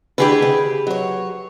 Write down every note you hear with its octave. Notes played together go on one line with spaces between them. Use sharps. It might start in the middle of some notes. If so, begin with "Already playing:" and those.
D3 E3 A3 G4 G#4 B4
C#3
F#3 C#5